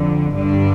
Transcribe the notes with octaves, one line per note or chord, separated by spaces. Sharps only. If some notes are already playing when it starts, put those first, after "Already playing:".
Already playing: F2 D3
G2 D3 D4